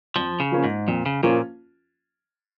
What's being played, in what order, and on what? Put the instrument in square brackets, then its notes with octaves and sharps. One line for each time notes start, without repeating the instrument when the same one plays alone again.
[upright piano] F2 [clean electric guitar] F3
[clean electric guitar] C#3
[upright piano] F3 A#3 C#4 F4
[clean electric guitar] G#2
[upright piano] F2 [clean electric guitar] A#2
[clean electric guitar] C#3
[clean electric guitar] A#2 [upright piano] F3 A#3 C#4 F4